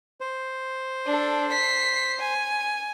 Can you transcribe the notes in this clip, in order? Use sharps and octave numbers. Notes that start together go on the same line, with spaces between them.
C5
D4 A4
B6 C7
G#5